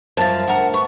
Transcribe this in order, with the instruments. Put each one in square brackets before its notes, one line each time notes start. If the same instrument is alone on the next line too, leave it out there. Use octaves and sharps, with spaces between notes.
[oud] F#2 F3 [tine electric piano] C5 E5 A6 [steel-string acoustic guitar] A5
[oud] D2 A#4 [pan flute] F#5
[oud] B3 [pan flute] C#6